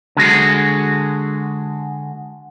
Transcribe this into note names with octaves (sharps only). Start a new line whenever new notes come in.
D3 G#3 F#4 G#4